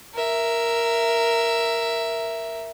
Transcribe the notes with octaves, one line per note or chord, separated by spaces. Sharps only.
A#4 E5